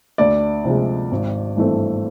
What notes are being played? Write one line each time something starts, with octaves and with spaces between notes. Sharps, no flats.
D2 D5
C3 F3 G#3
G#1
G2 E3 A3 C4